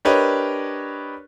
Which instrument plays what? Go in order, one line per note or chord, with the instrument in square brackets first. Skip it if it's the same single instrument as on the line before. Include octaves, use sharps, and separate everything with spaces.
[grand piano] D4 G4 A#4 B4 C#5 D#5